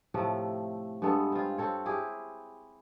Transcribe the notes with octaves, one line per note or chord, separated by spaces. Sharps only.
A2 C3 F3 A3
G2 G#3 B3 A4
C4 F4
C4 A4 C#5
E4 G4 G#4